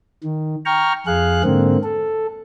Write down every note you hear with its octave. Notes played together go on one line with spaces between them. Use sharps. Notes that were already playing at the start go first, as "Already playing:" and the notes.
D#3
G5 A#5 C#6 F6
F2 G#4 F5 F#6
G#2 D3 A#3 C4
A4